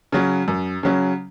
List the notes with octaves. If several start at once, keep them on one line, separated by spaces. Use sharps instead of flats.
C#3 F#3 C#4
F#2
C#3 F#3 C#4